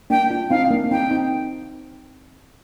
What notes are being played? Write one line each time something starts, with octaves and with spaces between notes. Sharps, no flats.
A#3 D4 G5
D4 F4
C4 D#4 F5
A#3 D4
C4 D#4 G5
C4 D#4